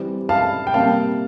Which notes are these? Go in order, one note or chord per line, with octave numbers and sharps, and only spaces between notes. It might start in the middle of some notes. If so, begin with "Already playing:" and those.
Already playing: E3 G3 C4
F5 A5
G5
C3 G3 A#3 F5 A5